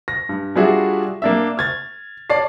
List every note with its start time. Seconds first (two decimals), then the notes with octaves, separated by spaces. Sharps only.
0.08 A#6
0.29 G2
0.56 G3 D4 F4 F#4 G#4 E5
1.22 A#3 D4 E5
1.57 F6 G#6 A6
2.30 C#5 D5 A5 C7